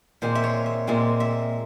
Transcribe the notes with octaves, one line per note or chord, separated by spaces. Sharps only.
A#2 G#3 C4 C5
E5
C#5
E5
A#2 G#3 C4 E5
E5